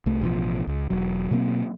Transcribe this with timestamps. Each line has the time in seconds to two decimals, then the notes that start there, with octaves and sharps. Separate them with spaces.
0.06 C2 A3
0.22 A1 B2 D3 F3
0.67 C#2
0.90 E1 F#3
1.31 B2 F#3 A#3 C4